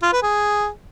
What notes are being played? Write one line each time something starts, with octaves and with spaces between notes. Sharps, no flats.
F4
B4
G#4